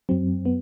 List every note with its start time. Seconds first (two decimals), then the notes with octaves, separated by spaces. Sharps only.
0.09 F#2 F#3 C4
0.45 B3